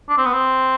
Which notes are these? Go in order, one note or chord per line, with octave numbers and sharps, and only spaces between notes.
D4
C4
B3
C4